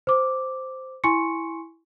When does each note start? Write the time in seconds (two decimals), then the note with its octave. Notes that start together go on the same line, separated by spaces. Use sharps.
0.07 C5 D6
1.04 E4 G#5 C6 C#6 C#7